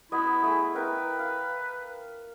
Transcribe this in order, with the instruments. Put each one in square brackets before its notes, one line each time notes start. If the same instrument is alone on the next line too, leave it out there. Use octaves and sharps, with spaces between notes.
[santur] B3 D#5 [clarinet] E4
[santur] A3 G#4
[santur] E4 A#4 G5 [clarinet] B4
[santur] F5